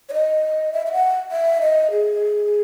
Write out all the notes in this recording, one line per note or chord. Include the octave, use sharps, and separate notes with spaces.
C#5
D#5
E5
E5
F#5
E5
D#5
G#4